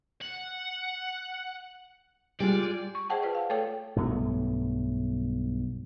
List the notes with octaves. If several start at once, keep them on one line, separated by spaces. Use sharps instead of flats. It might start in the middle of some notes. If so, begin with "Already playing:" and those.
F#5
G3 G#3 F4 D5
C#6
G#4 C5 D#5 F#5 G5 A5
F4 B4 D5 G5
F5
A3 A4 C#5 G5
B1 G2 F#3 A3